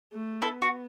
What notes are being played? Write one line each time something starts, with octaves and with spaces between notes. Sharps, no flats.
A3
B3 E4 A4
F#4